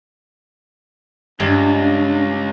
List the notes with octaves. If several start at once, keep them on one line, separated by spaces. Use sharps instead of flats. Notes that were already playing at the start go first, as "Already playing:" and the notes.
C#2 G2 D4